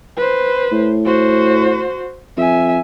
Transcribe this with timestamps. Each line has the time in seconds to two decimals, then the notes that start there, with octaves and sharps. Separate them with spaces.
0.17 B4 C5
0.72 A2
1.05 F#4 C5
2.37 F2 E5 G#5